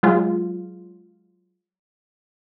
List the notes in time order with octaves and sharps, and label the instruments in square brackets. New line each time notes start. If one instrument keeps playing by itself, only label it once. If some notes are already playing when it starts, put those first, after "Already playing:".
[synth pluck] F#3 G#3 F4